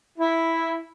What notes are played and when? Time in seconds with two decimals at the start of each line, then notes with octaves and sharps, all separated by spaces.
0.18 E4